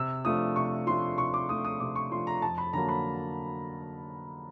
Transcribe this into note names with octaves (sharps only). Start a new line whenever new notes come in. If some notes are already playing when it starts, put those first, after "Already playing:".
Already playing: C3 E6
F3 A3 D4 F4 D#6
C3 C#6
F3 A3 D4 F4 C6
C3 C#6
D6
F3 A3 D4 F4 D#6
D#6
C3 D6
C#6
F3 A3 D4 F4 C6
A#5
F2 A5
B5
D3 F#3 A#3 A#5
B5